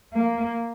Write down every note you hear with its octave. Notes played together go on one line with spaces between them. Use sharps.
A#3